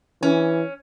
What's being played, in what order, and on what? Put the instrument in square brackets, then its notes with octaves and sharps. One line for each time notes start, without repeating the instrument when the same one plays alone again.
[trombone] E3 [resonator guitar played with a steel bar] C#4